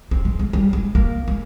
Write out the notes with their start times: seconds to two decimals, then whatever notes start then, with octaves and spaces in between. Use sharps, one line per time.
0.11 C4
0.25 G#3
0.39 G#3
0.53 G3
0.73 G#3
0.95 A#3
1.28 G#3